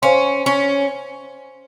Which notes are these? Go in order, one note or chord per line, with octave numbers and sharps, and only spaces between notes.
C#4 C5 F5 G#5 C6
C#4